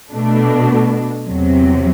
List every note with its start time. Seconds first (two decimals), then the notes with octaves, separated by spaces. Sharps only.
0.13 B2 A3 D4
1.25 E2 C3 F#3